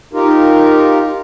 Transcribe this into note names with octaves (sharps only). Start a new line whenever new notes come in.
D#4 F4 G4 A#4